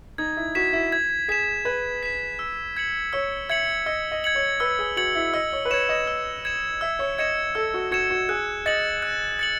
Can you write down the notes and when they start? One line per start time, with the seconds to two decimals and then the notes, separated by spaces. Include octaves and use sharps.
0.18 D#4 G#6
0.37 E4
0.55 F#4 B6 E7
0.73 E4
0.92 G#6
1.28 G#4 B6 E7
1.65 B4 G#6
2.03 B6 E7
2.39 E6
2.77 G#6 C#7 F#7
3.13 C#5 E6
3.49 E5 G#6 C#7 F#7
3.86 D#5 E6
4.11 D#5
4.24 G#6 C#7 F#7
4.35 C#5
4.60 B4 E6
4.79 G#4
4.97 F#4 G#6 C#7 F#7
5.15 E4
5.34 D#5 E6
5.53 C#5
5.65 B4
5.71 C#5 G#6 C#7 E7
5.89 D#5
6.07 E6
6.45 G#6 C#7 E7
6.81 E5 E6
6.99 C#5
7.18 D#5 G#6 C#7 E7
7.55 A4 E6
7.74 F#4
7.91 F#4 G#6 C#7 E7
8.10 F#4
8.29 G#4 F#6
8.66 D#5 A6 C#7 F#7
9.02 F#6
9.39 A6 C#7 F#7